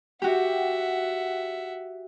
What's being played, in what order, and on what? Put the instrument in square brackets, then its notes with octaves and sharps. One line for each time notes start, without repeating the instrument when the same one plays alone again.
[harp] F#4 G4 [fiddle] E5 F#5